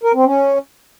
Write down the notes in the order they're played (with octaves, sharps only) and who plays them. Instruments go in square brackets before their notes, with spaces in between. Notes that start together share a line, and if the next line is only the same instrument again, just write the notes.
[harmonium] A#4
C4
C#4